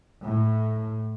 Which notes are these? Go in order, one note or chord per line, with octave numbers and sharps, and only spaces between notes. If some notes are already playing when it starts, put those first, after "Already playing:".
A2